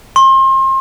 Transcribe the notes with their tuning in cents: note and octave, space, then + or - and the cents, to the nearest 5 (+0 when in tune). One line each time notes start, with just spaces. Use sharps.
C6 +35